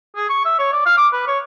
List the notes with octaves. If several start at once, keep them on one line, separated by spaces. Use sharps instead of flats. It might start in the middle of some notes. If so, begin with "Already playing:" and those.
G#4
C#6
E5
C#5
D5
F5
D6
B4
C#5